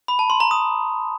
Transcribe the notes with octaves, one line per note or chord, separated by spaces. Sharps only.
B5
A5
C6
A#5
D#6